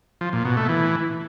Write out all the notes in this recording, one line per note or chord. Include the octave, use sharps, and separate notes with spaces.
F3
A#2
B2
A3
E3